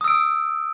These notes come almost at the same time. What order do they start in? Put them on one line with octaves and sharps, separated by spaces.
D#6 E6 D7